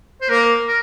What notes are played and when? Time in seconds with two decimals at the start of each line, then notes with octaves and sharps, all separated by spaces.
0.21 C5
0.29 A#3 A#4
0.67 A#4